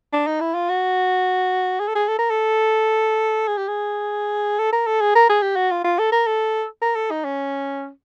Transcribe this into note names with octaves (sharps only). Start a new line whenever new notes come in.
D4
D#4
E4
F4
F#4
G#4
A4
G#4
A4
A#4
A4
G#4
G4
G#4
A4
A#4
A4
G#4
A#4
G#4
G4
F#4
F4
F4
A4
A#4
A4
A#4
A4
D#4
C#4